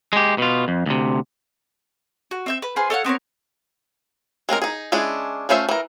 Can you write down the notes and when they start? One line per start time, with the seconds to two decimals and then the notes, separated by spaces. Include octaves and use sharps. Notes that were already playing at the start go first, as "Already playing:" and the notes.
0.13 G#3 G4
0.38 B2 F4
0.68 F2
0.86 D2 C3
2.31 F#4
2.46 C4 E5 G6
2.62 B4
2.76 F4 G#4 B4 C5
2.90 A4 C#5 F5 F#5
3.04 B3 C4 A#4 C#5
4.49 G#3 C4 C#4 A#4
4.62 D#4 G#4
4.92 G#3 C#4 D4 E4 G#4
5.49 A3 C#4 F4 C5 E5
5.69 E3 A#4